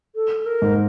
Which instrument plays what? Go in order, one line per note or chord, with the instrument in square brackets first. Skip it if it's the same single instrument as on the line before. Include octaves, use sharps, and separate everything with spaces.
[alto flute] A4
A#4
[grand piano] G#2